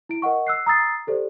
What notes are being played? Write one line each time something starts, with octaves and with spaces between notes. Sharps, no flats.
E4 D7
A#4 D#5 F#5 C#6
E6 F#6 C7
A#5 D#6 E6 A6 C7
G4 A4 C5 D5